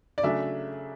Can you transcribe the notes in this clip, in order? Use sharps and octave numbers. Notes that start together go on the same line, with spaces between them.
D5
C#3 F#3 A3 D4 E5